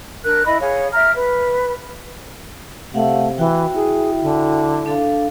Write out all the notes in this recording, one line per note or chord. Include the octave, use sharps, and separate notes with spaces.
D4 A#4 F#6
E4 D#5 B5
G#4 C#5 F5
E5 A#5 F6
B4
C3 A3 F5 F#5
E3 F#4 G5
E4 G#4
D3
D4 A4 F5